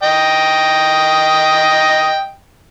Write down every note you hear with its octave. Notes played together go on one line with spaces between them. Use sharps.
D#5 G5